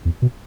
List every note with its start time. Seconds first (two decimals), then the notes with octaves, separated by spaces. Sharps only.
0.05 E2
0.22 B2